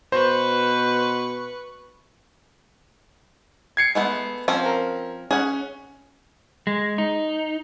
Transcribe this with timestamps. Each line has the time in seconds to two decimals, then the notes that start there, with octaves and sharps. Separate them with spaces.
0.12 B2 B4 C5 C#6
3.77 G#6 C7 C#7
3.95 G#3 A3 B3
4.48 F3 C4 C#4
4.65 A#4
5.31 C#4 G#4 F#5
6.67 G#3
6.98 D#4